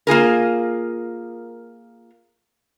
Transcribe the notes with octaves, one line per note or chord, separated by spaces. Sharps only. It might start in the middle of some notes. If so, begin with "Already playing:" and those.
A#3 F4 G#4 A#4